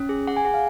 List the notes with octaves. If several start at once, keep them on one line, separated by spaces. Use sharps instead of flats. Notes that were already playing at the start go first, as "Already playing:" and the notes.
Already playing: C#4
G#4
G#4 F#5
G#5
G#4 F#5
F5